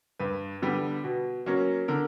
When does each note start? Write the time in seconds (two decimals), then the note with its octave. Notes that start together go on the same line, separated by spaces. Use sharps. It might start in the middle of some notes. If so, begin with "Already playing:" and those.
0.19 G2 B4
0.62 D3 G3 B3
1.04 B2
1.46 F#3 A#3 C#4
1.88 D3 A#4